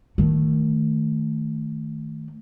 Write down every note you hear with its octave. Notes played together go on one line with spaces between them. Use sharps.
D#3 A3